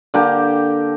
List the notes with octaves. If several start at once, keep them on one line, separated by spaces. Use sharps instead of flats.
D3 A#3 G4 G5